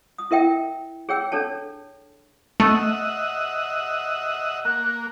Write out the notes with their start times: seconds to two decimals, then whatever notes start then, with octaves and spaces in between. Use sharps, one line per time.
0.18 D#6
0.31 E4 A#4 E5 G5
1.09 G#4 C#5 G5 E6
1.32 D4 A4 C#5 A5
2.60 A3 D#5 E5 F#5
4.65 A#3 F#6